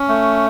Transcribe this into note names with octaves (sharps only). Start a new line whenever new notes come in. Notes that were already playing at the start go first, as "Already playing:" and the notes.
Already playing: C#4
A3